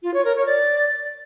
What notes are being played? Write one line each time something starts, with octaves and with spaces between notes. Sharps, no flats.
F4
C#5
A#4
C#5
D5